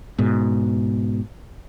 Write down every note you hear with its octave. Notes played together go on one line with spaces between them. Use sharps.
G#2 B2